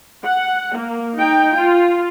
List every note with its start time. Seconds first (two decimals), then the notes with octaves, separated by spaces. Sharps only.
0.25 F#5
0.78 A#3
1.16 D#4 G5
1.56 F4